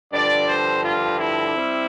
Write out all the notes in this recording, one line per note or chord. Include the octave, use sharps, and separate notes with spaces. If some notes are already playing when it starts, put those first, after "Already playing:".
G2 D3 F3 D5
C5
F4
E4
G3 C4